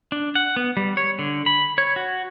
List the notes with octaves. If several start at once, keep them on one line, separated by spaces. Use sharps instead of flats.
D4
F#5
B3
G3
C#5
D3
B5
C#5
F#4